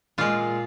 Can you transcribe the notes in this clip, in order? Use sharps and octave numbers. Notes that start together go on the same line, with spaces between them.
A#2 G#3 F4